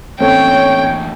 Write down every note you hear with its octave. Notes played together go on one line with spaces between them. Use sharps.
A2 E3 A#3 C4 C#4 A4 C#5 G5